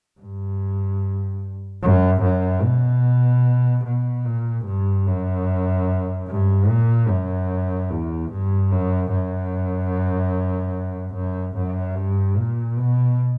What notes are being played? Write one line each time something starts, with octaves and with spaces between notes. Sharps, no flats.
G2
F#2
F#2
B2
B2
A#2
G2
F#2
G2
A#2
F#2
E2
G2
F#2
F#2
F#2
F#2
G2
A#2
B2